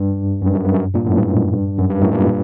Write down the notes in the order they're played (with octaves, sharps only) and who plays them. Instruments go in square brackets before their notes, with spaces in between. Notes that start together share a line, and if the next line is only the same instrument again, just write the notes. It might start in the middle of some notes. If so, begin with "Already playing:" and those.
Already playing: [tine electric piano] G2
F#2
G2
F#2
G2
F#2
G2 A#2
F#2 A2
G2
F#2
G2
F#2 A2
G2 A#2